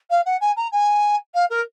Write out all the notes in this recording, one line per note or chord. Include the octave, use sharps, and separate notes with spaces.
F5
F#5
G#5
A#5
G#5
F5
A#4